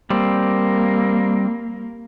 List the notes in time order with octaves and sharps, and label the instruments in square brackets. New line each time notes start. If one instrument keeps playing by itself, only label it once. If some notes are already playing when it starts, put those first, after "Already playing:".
[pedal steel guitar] G3 C4 [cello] A#3